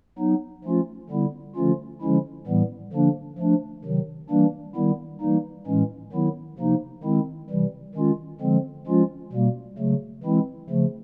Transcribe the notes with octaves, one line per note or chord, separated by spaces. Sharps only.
F#3 B3 D#4
F3 A3 C#4 F4
D3 G3 B3 E4
D3 F3 A3 C#4 F4
D3 F3 G#3 C#4 E4
A2 E3 G3 B3
D3 F3 A#3 D4
F3 A3 D4
C3 D#3 F#3
E3 G3 A#3 D4
D#3 G3 B3 E4
E3 G3 A#3 D#4
A2 E3 G#3 C#4
D#3 F#3 B3 E4
C3 F3 A#3 D#4
D#3 G#3 C4 E4
C3 E3 G3
D#3 G#3 C#4 F4
D3 F3 G#3 C4
F3 G#3 C#4 F4
B2 G3 A#3
C#3 F#3 A3
E3 G#3 C4 E4
C#3 F3 A3